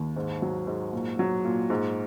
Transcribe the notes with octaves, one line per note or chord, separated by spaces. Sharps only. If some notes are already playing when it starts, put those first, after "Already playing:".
Already playing: D#2
G#2
F#3
G#2
A#2
F#3
A#2
G#2